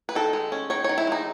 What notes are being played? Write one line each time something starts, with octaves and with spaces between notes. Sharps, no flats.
B4
D#3 A4
G#3
C#4
D#3 C#5
C#5
D#3
E4
G#3 D#4